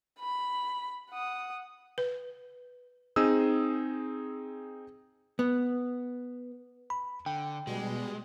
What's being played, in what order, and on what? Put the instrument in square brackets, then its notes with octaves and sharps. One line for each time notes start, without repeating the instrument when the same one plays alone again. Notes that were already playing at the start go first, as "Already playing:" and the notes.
[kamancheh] B5
F#5 D#6
[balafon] B4
[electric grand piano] C4 D#4 G#4 D#6 E6
[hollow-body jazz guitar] B3
[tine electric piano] B5
[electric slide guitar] D3 [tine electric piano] G5
[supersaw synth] B2 G3 [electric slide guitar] G#3